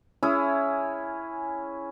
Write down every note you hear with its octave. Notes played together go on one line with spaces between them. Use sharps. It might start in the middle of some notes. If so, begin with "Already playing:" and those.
C#4 E4 G#4